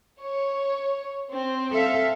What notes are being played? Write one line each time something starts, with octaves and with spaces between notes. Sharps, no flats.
C#5
C4
A4 E5 F5